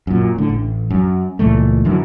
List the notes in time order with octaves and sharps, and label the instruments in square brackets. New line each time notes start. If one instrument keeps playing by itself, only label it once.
[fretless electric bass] F#2 A#2
A2 D3
A1
F#2
C#2 A#2 E3 A3
F#2 D3 E3 F#3